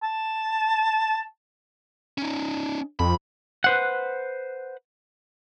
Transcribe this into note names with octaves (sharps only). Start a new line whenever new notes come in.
A5
C#4 D#4
F2 B5
B4 C5 F#5